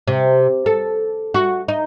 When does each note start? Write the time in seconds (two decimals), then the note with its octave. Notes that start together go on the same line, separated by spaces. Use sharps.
0.08 C3
0.66 A4
1.34 F#4
1.68 D#4